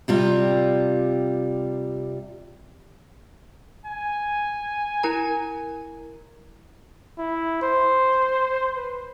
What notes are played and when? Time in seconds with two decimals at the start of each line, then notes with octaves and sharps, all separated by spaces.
0.08 C3 G3 F4
3.86 G#5
5.03 E4 A#4 A#5
7.18 E4
7.62 C5
8.77 B4